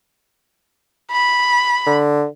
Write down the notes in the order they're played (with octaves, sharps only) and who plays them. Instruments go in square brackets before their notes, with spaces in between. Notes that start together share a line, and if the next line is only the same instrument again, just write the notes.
[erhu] B5
[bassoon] D3